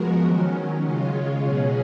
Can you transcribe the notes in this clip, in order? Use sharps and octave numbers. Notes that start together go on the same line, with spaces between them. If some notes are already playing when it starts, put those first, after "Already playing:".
Already playing: F3 G#3 B3 F#4 A#4
D#3 F#3 C#4
C#3 G#3 C#4 F4
B2 F#3 C#4 G#4